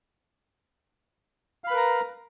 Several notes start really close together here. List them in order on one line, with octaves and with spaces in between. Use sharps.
F5 B5 B4 A#4 A#5